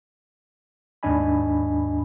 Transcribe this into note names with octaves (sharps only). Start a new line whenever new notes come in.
D#2 G#2 D4 D#5 G#5 B5